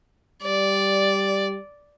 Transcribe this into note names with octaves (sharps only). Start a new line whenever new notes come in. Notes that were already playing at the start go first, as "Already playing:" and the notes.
G3 D5